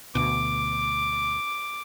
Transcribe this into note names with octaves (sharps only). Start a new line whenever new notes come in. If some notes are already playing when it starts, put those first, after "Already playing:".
D2 B2 D6